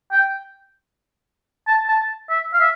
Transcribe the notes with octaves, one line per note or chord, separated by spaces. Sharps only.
G5
A5
A5
E5
F5
E5